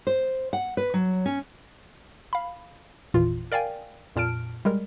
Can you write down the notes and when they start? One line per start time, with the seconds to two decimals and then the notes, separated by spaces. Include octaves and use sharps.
0.07 C5
0.53 F#5
0.77 B4
0.94 F#3
1.26 C#4
2.33 F5 B5
3.14 G#1 E2 A#2 E3 F4
3.52 A#4 D5 F5 G5 G#5
4.16 F2 A#2 A5 F6 D7
4.65 G3 G#3 A#4